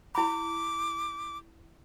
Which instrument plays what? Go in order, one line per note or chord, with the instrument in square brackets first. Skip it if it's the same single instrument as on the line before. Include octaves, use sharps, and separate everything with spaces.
[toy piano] E4 B5 [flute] D6